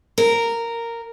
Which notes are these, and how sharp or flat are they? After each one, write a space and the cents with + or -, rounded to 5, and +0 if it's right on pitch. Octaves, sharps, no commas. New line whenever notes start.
A#4 -10